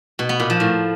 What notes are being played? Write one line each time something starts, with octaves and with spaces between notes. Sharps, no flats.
B2
B3
A#2
F3
A2